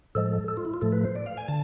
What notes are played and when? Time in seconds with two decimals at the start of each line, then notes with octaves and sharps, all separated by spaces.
0.15 A2 F3 G#3 A4
0.48 A4
0.57 F4
0.65 E4
0.74 F4
0.81 A2 F3 A3 A4
0.92 B4
1.04 C5
1.15 D5
1.26 F5
1.37 G#5
1.48 D3 A5